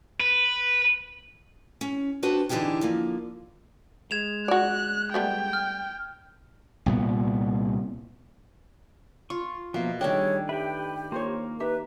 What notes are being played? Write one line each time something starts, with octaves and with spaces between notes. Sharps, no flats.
B4
C#4
B3 D4 F#4 G4 B4 C5
D3 E3 D4 D#4 G4 G#4
D3 F3 A#3
G#3 G#6 E7 F7
F#4 D5 F#6
G3 A3 B3 G5
F6
C2 A#2 B3
F4 C#6
B2 F3 A#3 E5 F5
D#3 G3 A3 D4 G#4 C#5 G5
G4 B4 E5 G5
A#3 F4 C5 C#5
D#4 G4 B4 E5